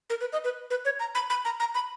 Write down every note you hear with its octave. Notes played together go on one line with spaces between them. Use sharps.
A#4
B4
D#5
B4
B4
C#5
A#5
B5
B5
A#5
A#5
B5